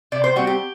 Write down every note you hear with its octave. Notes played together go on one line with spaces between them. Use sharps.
C3 D5
C5
G3 C4 F#4
G4